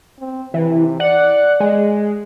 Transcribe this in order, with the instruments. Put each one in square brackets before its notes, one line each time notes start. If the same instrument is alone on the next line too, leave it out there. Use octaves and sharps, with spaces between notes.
[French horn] C4
[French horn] C3 [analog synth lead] E3
[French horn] D5 [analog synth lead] F#5
[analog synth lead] G#3